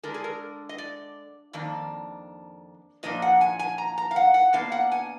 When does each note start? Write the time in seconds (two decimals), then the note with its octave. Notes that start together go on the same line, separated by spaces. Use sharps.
0.03 D3 G#3 D4 A#4
0.14 G#4
0.24 A#4
0.69 D#5
0.78 D5
1.53 F2 D#3 A#3 D4
3.03 A#2 F3 A#3 D4 D#5
3.22 F#5
3.41 G#5
3.59 G#5
3.78 A#5
3.98 A#5
4.11 F5
4.16 F#5
4.34 F#5
4.53 B2 A#3 D4 F5
4.72 F#5
4.92 G#5